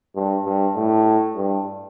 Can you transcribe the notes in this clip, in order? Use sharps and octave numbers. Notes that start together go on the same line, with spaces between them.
G2
G2
A2
G2